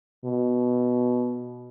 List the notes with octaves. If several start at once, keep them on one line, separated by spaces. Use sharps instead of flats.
B2